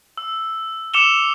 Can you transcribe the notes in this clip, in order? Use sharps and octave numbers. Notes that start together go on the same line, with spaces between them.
E6
D6 E6 C#7 E7 F7 G7